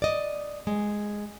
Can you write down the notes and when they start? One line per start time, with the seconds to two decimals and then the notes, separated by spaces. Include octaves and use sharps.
0.02 D5 D#5
0.67 G#3